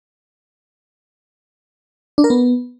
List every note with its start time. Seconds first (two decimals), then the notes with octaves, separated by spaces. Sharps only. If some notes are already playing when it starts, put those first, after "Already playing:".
2.18 D4
2.24 A#4
2.30 B3